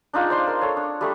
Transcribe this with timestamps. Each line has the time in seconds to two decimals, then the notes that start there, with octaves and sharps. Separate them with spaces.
0.13 D4 D#4 F4 G#4
0.30 C5 D5 C6
0.47 A#4
0.62 A4 C#5
0.77 D4
1.01 G3 A3 G#4